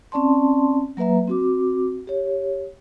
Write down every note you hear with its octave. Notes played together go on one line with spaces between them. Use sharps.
C4 C#4 D5 A5 C6
F#3 A#3 B4 E5 A#5
C4 F#4 D6
G4 C#5